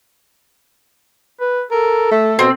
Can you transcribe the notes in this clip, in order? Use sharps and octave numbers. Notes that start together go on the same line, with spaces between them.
B4
A4 A#4
A3
B2 C4